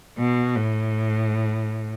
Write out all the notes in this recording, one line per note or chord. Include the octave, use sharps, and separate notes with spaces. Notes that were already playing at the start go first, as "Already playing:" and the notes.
B2
A2